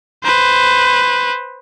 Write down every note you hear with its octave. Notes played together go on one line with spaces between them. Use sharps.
B4 C5